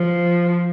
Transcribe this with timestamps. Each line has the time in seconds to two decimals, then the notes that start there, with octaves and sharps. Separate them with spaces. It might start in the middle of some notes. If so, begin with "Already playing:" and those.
Already playing: F3